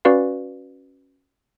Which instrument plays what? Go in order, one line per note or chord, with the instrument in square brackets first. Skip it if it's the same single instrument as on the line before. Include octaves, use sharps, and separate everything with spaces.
[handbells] C#4 F#4 B4 D5 F5